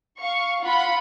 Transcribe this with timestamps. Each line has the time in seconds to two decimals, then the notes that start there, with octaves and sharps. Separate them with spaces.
0.18 F5 C#6
0.62 F4 F#5 B5